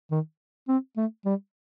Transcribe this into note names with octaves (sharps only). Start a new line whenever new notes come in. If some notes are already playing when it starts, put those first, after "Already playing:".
D#3
C4
A3
G3